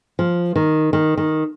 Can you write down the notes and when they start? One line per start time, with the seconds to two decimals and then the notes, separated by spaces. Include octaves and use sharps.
0.19 F3
0.56 D#3
0.93 D#3
1.17 D#3